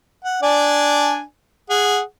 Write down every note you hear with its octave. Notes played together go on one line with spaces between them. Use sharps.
F#5
D4 D5 G#5
G#4 F#5